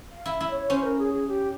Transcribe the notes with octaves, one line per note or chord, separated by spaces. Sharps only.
F5
E4
E5
E4
C#5
C#4 C5
A#4
G#4
G#4
G4